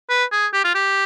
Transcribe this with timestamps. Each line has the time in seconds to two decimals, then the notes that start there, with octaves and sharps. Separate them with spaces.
0.09 B4
0.32 G#4
0.53 G4
0.64 F4
0.74 G4